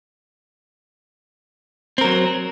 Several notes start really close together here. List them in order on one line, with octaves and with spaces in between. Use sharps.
C4 A#4 F#3